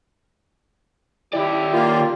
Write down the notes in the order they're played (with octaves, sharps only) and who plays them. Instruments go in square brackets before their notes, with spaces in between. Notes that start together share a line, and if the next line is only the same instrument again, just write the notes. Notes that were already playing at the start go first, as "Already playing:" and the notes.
[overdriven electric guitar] D#3 D5 [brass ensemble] E4 [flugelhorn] G4
[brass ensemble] A#3 [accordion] F4